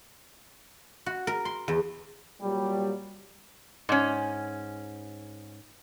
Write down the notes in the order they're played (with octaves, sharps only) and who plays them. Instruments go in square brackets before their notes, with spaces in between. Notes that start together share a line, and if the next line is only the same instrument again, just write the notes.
[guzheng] F#4
A#4
C6
E2
[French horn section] A#2 F#3 G3
[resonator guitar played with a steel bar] G#2 C#4